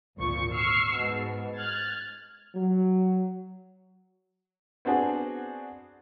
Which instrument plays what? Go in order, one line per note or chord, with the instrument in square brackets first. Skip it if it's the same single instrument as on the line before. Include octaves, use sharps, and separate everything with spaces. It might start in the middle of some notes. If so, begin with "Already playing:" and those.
[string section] G#1 D2 A#2 F3 C#6
C#6 E6 F6 C7
G#2 B2
F6 F#6 G#6 A6
[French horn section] F#3
[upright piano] B3 C4 D4 F#4 G#4